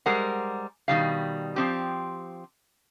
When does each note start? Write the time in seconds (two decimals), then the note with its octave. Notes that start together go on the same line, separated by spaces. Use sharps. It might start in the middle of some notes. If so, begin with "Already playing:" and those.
0.06 G3 G#3 A#4 C5 F#5
0.88 B2 D#3 G3 F5
1.56 F3 C4 G4